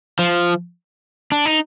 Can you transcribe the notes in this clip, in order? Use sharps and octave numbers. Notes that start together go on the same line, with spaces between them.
F3
D4
D#4